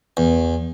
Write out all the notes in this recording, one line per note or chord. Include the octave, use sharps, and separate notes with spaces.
E2